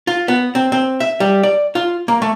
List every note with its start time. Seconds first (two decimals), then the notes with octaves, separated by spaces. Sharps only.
0.07 F4
0.28 B3
0.55 C4
0.72 C4
1.00 E5
1.20 G3
1.43 D5
1.75 F4
2.08 A#3
2.22 A3